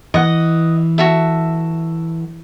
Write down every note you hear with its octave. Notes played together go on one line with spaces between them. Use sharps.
E3 D#5 F#5
F#4 A4 E5